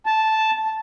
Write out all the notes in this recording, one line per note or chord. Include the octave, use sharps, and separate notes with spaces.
A5